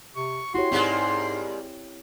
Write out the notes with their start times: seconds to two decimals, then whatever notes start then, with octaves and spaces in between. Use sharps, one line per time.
0.16 C3 C#6
0.54 E4 F#4 G4 C#5 C6
0.72 G#2 G3 G#3 A#3 C4